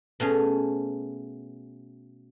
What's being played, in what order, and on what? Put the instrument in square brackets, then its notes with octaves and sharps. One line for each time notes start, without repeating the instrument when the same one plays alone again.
[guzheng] B2 A3 C#4 G#4